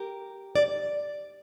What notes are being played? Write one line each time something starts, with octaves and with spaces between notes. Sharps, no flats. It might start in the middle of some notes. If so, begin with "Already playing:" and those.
Already playing: G4 A#4
D5